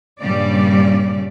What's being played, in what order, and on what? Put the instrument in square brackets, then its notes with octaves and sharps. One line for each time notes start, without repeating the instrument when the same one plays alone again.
[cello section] G2 A#2 C#3 G3 D5